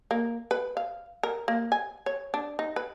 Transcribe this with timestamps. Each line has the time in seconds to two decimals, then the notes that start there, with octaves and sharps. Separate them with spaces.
0.11 A#3
0.51 B4
0.77 F5
1.23 A#4
1.48 A#3
1.72 G#5
2.06 C#5
2.34 D4
2.59 D#4
2.76 B4